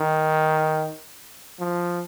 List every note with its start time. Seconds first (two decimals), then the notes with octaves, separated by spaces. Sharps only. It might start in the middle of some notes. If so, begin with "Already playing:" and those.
Already playing: D#3
1.59 F3